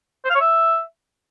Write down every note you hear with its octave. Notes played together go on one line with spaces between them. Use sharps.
C5
F5
C#5
E5